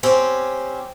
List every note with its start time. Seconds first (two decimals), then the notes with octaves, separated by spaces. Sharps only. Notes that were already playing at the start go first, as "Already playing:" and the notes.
0.03 C4 C#4 G4